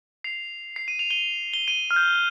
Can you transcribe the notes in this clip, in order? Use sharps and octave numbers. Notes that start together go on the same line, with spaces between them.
C7 F7
C7
D#7
F7
D#7 G7
G7
D#7 G7
F6
G6